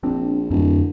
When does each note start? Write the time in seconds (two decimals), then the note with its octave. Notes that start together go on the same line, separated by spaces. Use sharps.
0.03 A#1 C4 D4
0.50 D1 F2